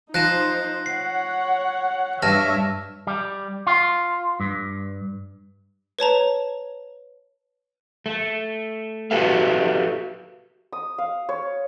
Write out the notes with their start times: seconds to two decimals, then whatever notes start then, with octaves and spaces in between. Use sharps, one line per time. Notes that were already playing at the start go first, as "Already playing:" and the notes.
0.14 F3 D#4 C5 F#6 A#6 E7
0.86 C#5 F#5 C7
2.23 G2 D4 C#5 E5 A5 F6 A#6
3.07 G3
3.67 F4
4.40 G2
5.99 B4 C#5 A5 A#5
8.06 A3
9.11 F#4 G4 A4 B4 E5 F5
10.72 D#6
10.98 F5
11.29 C#5